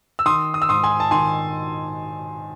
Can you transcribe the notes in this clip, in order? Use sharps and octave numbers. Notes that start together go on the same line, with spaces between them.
E6
D#3 C6 D#6
D#6
E6
G#2 C6 D#6
G#5 C6
A5
D#3 G#5 C6